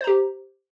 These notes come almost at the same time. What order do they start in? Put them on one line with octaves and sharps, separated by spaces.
C5 A#5 G4